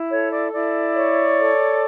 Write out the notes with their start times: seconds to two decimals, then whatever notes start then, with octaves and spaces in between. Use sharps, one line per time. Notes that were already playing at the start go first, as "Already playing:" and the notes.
Already playing: E4
0.10 A4 C#5
0.31 D5
0.52 E4 D5
0.95 C#5
1.37 A4